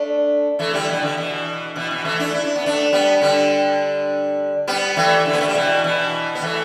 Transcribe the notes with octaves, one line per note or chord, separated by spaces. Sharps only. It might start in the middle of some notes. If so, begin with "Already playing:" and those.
Already playing: A3 D4
E3 A3
D3 G3
B2 E3
D3
B2 E3
B2 E3
B2 E3
E3 A3
A3 D4
E4
D4
B3
A3 D4
G3 B3
D3 G3
G3 B3
E3 A3
D3
B3
A3
G3
B2 E3
B2 E3
B3
E3 A3